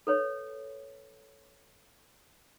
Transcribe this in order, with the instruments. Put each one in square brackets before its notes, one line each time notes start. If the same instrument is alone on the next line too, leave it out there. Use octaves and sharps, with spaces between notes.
[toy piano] A4 B4 C#5